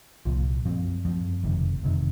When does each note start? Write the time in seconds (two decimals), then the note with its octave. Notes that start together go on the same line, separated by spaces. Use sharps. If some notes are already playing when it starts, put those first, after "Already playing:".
0.25 C2 A#2 F3
0.65 F#2 F3 C4
1.05 F#2 F3 C4
1.43 F#1 F2 C3 D#3
1.83 F#1 F2 C3 D#3